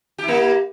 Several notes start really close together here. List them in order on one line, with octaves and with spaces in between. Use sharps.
G4 E4 A#3